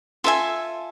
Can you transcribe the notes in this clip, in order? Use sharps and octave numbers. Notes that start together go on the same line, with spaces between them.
F4 A4 E5 G#5